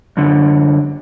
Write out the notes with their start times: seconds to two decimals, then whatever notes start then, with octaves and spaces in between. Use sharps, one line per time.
0.17 F#2 D3